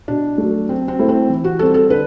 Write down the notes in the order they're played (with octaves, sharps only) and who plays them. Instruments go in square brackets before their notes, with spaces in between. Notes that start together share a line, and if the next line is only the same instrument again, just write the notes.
[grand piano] B2 [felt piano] D4
[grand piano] F#3 A3
[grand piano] F#3 [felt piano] C4
[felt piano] C4
[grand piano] A3 E4 A4 C5
[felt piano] C4
[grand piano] E3
[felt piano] F#4
[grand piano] G3 C4 [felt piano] A4
[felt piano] A4
[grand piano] D3 [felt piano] B4